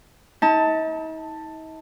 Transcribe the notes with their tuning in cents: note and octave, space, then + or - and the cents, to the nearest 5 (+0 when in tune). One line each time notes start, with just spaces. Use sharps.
D#4 +45 A5 +10